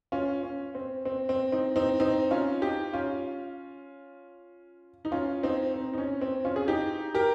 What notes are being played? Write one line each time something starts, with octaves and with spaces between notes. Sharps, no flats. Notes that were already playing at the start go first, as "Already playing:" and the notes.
C#4 F4
C#4
C4
C4
C4
C4 D#4
C4 D#4
C4 D#4
C#4 F4
D#4 G4
C#4 F4
D#4
C#4 F4
C4 D#4
C4
D#4
C#4
C4
C#4 F4
G#4
D#4 G4
G4 A#4